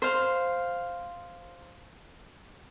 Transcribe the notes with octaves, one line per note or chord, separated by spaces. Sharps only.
C5 F5